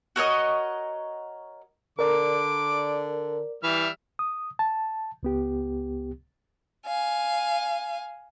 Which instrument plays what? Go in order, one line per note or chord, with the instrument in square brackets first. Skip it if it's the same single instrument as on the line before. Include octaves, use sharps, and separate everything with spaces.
[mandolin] F#4 A#4 C#5 D#5
[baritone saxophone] D3 [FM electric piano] A#4 D5 [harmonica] D6
[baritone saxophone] E3 [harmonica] G3 E5 F6
[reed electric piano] D#6
A5
C#2 B3 G4
[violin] F5 G#5